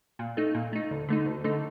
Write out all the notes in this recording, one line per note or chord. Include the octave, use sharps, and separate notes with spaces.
A#2
A3 D#4
A#2
A3 D#4
D2
D3 A3 D#4
D2
D3 A3 D#4